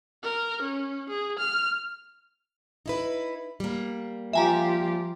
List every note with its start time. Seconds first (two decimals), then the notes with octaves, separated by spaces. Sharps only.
0.23 A#4
0.62 C#4
1.09 G#4
1.39 F6
2.86 D#4 E4 B4
3.60 G3 A#3
4.33 F3 F4 G4 E5 G#5 A#5